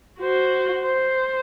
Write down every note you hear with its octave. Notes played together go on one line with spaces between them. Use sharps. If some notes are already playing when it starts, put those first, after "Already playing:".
F#4 C5
C5